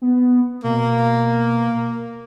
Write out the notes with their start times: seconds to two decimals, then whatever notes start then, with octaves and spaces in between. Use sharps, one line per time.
0.02 B3
0.64 B2 A#3